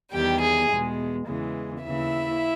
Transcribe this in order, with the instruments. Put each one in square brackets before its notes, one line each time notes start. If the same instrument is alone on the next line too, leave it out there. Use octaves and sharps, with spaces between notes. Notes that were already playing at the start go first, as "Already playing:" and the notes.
[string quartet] E2 D#3 G3 G4 G5
G#4 G#5
E2 B2 G#3
E2 C#3 E3 G#3
D#2 C#3 E3 E4 E5